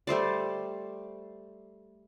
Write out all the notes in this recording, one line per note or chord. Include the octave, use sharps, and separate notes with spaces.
G3 A3 C5 D5